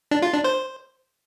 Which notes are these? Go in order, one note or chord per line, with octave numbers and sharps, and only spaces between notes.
D4
F4
D4
C5